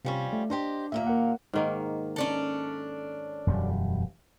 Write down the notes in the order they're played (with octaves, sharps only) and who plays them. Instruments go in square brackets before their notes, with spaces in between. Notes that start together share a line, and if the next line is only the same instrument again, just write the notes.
[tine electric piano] C3 [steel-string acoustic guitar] F3 G3 C#4
[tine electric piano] A3
[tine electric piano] D4 [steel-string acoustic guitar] G4 C5 D#5
[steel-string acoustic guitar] D#2 A#2 A#3 [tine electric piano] E5
[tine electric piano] A#4 F#5
[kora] G#2 D#3 A#3
[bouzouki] C#4 D4 A4
[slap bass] E1 F#2 G3